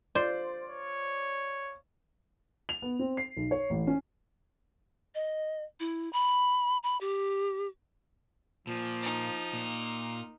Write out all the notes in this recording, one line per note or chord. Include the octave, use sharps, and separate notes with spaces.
F4 C5 D5
C#5
F7
B3
C4
C7
B1
C#5
A1
C#4
D#5
E4
B5
B5
G4
A#2 F3
D#4
A#2